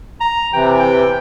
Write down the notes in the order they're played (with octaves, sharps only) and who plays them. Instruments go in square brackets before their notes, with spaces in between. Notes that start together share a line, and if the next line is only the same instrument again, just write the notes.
[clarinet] A#5
[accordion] C3 E3 [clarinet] G5
[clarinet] G5